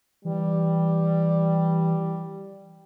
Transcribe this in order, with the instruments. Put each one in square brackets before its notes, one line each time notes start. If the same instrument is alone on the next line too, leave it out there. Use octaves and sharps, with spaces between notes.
[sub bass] E3 [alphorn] G3